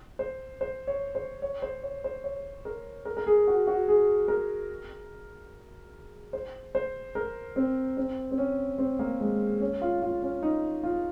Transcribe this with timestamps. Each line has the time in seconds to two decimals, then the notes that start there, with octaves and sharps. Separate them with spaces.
0.19 C5
0.61 C5
0.87 C#5
1.15 C5
1.42 C#5
1.62 C5
1.83 C#5
2.04 C5
2.24 C#5
2.65 A#4
3.05 A#4
3.17 A#4
3.27 G#4
3.47 F#4
3.67 F#4
3.88 G#4
4.28 A#4
6.33 C5
6.75 C5
7.15 A#4
7.56 C4
7.97 C4
8.31 C4
8.38 C#4
8.78 C4
8.99 A#3
9.21 G#3
9.61 C#4
9.82 F4
10.02 F4
10.22 C#4
10.43 D#4
10.83 F4